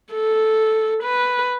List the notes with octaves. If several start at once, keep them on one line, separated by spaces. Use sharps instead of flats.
A4
B4